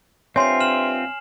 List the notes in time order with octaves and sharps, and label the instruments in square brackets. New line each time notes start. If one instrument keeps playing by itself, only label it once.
[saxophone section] G2 E5 [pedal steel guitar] C4 F4 [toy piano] C#5 C6 [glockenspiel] G#5 C7
[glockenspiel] F6 E7 F#7